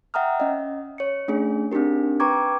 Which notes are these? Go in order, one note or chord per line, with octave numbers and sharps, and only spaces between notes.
E5 F#5 G5 A#5 D#6 F6
C#4 D#5
C#5 C#7
A3 C#4 D4 G#4
C4 D4 D#4 G4 A#4
B4 G5 A#5 C#6 D6 G#6